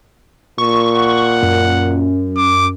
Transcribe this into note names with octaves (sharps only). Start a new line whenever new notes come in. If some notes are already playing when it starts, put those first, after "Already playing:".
A#2 C#6
F#5
F#2
D6